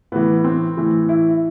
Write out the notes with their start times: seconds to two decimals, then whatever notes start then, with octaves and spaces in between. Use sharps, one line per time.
0.12 A2 E3 B3
0.44 C4
0.77 A2 E3
1.09 E4